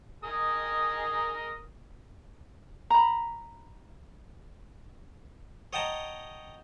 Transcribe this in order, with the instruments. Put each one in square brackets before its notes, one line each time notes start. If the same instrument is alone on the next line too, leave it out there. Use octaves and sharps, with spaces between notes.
[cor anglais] G#4 [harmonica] A#4 D#6
[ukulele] A#5 B5
[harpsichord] C#5 D#5 F#5 G5 A5 A#5